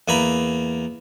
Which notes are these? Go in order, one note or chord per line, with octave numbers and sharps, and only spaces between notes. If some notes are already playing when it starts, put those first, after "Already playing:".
E2 A#3 G#5 A#5 B5